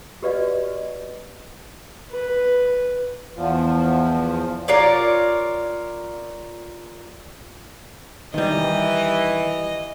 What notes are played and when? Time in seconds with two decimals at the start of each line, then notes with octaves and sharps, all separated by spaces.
0.22 F#4 G4 B4 D5 D#5 F5
2.10 B4
3.35 E2 F3
4.68 F4 A#4 C#5 D5
8.34 D#3 E3 G3 D#5